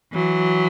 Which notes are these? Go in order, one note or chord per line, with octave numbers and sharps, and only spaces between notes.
E3 F#3